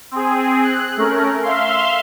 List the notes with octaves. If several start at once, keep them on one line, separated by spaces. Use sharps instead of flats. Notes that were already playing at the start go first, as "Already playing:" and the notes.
C4 G#4
F#6
A3 C#4 A#4
E5 F5 C6